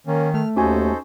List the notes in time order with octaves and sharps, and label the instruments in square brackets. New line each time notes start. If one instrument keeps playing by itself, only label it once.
[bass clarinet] D#3 [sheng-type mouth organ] A#3 C#4
[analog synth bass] A3 [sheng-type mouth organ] F6
[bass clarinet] D#2 [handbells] C#4 F#4 G#5 [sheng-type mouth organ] D#4 A4 C5